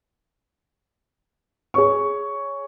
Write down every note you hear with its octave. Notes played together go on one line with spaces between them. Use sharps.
G#4 C#5 C#6